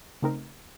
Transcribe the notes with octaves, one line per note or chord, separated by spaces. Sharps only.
C#3 A3 C4 D#4 A#4